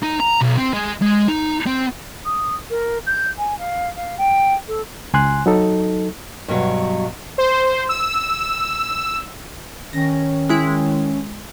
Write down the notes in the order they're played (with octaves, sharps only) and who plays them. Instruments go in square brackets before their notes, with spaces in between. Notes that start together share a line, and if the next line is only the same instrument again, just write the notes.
[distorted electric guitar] D#4
A#5
B1
C4
G#3
G#3
D#4
C4
[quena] D#6
A#4
G6
G#5
F5
F5
G5
A4
[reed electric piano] C#2 G#5 C6 F#6
F#3 D#4 A4
[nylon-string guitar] G2 B2 F#3
[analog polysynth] C5
E6
[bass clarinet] D#3 [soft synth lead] C#4 [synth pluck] A#6
[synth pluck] G#3 E4